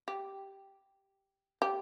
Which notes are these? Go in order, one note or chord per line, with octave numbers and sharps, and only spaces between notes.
G4
G4